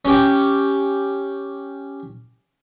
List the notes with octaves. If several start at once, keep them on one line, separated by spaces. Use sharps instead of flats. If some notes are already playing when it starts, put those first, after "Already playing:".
C#4 G4